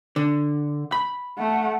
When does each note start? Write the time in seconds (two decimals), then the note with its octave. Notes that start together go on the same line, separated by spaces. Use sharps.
0.16 D3
0.92 B5
1.38 A3 F#5